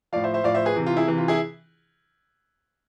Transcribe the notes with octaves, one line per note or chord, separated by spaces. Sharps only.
A2 F3 D5 F5
C5 E5
C5 E5
A2 F3 D5 F5
C5 E5
G#4 B4
C3 E3
F4
E4 G#4
C3 E3
F4
E4 G#4